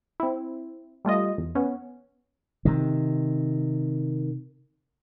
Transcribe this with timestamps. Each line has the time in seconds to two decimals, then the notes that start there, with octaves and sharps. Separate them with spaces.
0.20 C4 E4
1.05 G3 A3 F4 D#5
1.38 E2
1.55 B3 C#4
2.65 C3 D#3